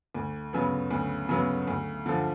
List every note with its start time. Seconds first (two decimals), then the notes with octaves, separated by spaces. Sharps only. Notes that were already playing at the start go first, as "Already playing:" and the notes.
0.14 D2
0.53 C#3 F#3 B3
0.91 D2
1.29 C#3 F#3 B3
1.67 D2
2.06 D3 F3